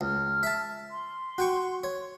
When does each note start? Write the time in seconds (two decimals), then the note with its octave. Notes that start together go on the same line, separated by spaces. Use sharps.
0.01 C#2 F6
0.43 E5 A5
0.91 C6
1.38 F#4 G5 C#6
1.84 C#5